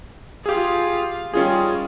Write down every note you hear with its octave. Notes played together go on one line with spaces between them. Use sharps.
F4 G4 G#4 F5
D#3 G3 C#4 F4 G#4